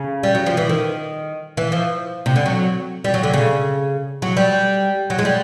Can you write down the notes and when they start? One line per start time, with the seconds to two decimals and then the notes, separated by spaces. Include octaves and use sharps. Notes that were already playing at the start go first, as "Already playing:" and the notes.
Already playing: C#3
0.23 G3
0.35 F#3
0.46 F3
0.57 E3
0.69 D#3
1.57 E3
1.72 F3
2.26 C3
2.36 D3
2.46 F#3
3.04 G3
3.14 F#3
3.23 D3
3.33 C#3
4.22 F#3
4.37 G3
5.10 F#3
5.19 G#3
5.25 G3